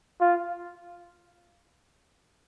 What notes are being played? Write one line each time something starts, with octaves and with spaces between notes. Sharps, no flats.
F4